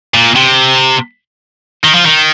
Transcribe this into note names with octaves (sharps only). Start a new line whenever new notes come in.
A#2
C3
D#3
F3
D#3